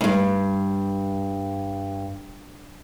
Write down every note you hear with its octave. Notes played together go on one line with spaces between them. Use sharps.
D2 G2